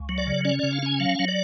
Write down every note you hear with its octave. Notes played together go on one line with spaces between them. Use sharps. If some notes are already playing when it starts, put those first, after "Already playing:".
Already playing: C#2
F#3
D5
C#3
C#4 D5
C#3 D5
F5
C#4 G#5
F#3 F5
F#3
D5